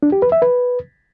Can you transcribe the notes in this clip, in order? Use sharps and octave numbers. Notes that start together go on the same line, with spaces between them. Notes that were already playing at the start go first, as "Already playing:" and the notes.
D4
G4
B4
E5
B4